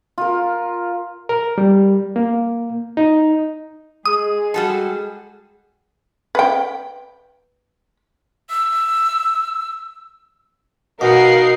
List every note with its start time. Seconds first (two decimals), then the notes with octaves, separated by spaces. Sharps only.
0.18 F4 A#4
1.29 A#4
1.58 G3
2.16 A#3
2.97 D#4
4.06 G#3 G#4 D#6
4.54 G3 F#4 A4
6.35 B4 G5
8.50 E6
11.01 B2 D#4 A#4 F5 F#5 C7